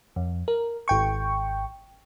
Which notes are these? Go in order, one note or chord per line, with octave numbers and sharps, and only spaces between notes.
F2
A#4
G#1 G5 C#6